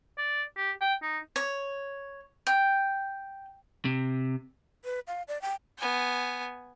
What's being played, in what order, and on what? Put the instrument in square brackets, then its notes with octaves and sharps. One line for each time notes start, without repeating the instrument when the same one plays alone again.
[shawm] D5
G4
G5
D#4
[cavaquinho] C#5
G5
[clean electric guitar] C3
[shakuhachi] B4
F5
D5
G5
[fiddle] B3 G#5